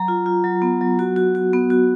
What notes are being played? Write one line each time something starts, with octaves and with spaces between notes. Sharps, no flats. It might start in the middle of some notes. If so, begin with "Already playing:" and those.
Already playing: F#3 A#5
F4
F4
F#3
B3
F#3
F#4
F#4
F#4
B3
F#4